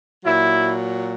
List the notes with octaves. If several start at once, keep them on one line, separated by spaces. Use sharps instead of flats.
A#2 F#3 E4